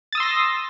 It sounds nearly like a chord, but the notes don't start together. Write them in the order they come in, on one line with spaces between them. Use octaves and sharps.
A6 D#6 E6 C6 A#6